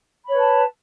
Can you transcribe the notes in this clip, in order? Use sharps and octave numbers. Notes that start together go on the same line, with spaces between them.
B4 C#5 A5 B5